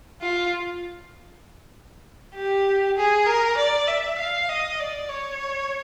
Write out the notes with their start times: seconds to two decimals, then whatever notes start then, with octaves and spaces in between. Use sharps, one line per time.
0.21 F4
2.35 G4
2.96 G#4
3.27 A#4
3.57 D5
3.87 E5
4.18 F5
4.49 D#5
4.79 D5
5.09 C#5